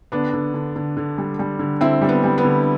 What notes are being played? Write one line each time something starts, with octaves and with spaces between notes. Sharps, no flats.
D3 B3 D4
D3
D3
D3
D3
G3
G3
D3
D3 C4 E4
G3
B3
G3
B3
D3